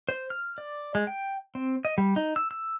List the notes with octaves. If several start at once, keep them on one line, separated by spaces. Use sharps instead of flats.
C5
F6
D5
G#3
G5
C4
D#5
G3
D#4
E6
E6